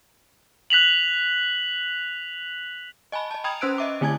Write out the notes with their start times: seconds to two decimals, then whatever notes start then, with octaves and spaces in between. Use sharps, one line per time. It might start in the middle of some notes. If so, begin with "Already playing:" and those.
0.70 F#6 B6 F7 F#7
3.12 D#5 G#5 A5 B5
3.31 D#5 A5
3.44 G5 A#5 B5 D#6 G#6 F7
3.61 C#4 C5 E6 F#6 D7
3.78 D#5 E5 D6
4.01 D3 A3 E4 G#5 A5 G#6